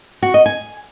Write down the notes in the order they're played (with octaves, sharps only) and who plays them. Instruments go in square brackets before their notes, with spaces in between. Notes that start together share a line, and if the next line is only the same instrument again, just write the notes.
[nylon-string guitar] F#4
D#5
G#5